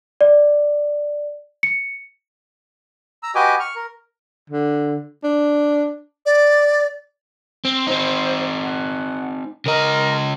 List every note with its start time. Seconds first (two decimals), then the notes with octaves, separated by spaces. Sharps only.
0.21 D5
1.63 C#7
3.23 A#5 E6
3.35 F#4 G4 B4 D#5 G#5 D6
3.60 C#6 F6
3.76 A#4
4.50 D3
5.24 D4
6.26 D5
7.65 C4
7.87 C4 D#4 C5
8.63 F#5
9.66 C#3 A#4 D#5